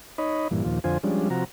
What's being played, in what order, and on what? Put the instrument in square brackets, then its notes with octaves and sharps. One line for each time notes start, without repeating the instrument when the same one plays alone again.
[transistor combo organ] D#4 C#5 D#5 B5
G2 A#2 E3
D#2 A#2 F3
F2 D3 F4 C5 G#5
F3 G3 G#3 C#4 D4
C3 F3 F#4 A#5